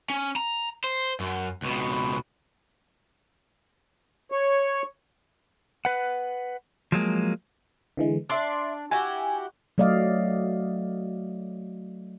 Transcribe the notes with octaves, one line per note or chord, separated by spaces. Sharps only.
C#4
A#5
C5
F#2
C#2 B2
C#5
B4 F#5
F3 F#3 G#3 A#3
D3 E3 G#3
D4 D5 E5 C6 D6
E4 F#4 G4 G#5
F#3 A3 D5 D#5 F5